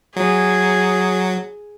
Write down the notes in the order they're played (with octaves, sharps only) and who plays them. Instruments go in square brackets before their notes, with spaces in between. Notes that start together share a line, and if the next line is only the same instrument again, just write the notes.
[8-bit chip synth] F#3 [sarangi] G#4